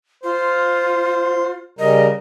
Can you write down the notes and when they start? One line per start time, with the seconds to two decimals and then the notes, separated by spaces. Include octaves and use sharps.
0.23 F4 C5
1.79 C#3 G3 A#4 D#5